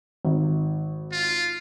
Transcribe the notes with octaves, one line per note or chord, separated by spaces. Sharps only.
G#1
F4